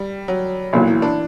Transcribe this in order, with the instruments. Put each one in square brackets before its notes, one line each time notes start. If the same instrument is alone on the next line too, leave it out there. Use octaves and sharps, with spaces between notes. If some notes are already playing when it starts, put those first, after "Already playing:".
Already playing: [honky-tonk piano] G3
F#3
[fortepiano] B1 A#2 F#3 [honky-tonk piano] E3
[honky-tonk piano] E3
D4